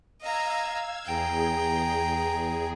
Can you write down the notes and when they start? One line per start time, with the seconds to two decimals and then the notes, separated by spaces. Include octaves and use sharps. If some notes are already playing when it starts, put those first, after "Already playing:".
0.20 D#5 F5 A#5 E6 G#6
1.05 E2 G#4 G5 A#5